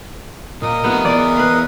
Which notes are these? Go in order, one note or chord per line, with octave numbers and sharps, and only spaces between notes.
A#2 A#4 D#5 D#6
A3 B3 F4 G4
E3 B3 D5
B4 F5